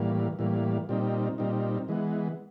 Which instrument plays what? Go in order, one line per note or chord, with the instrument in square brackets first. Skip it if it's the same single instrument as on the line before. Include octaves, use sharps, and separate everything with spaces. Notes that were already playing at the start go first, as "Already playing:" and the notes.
Already playing: [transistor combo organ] A2 E3 G3 A#3
A2 E3 G3 A#3
A#2 G3 C4 D#4
A#2 G3 C4 D#4
E3 G#3 B3